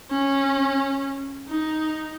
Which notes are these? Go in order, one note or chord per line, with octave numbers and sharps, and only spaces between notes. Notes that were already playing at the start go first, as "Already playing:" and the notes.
C#4
D#4